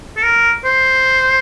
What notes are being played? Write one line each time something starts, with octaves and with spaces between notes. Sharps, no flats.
A4
A#4
C5